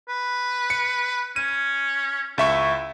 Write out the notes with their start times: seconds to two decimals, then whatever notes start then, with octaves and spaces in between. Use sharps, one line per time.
0.09 B4
0.70 C#7
1.36 C#4 D#7
2.38 C#2 E4 E5 C#6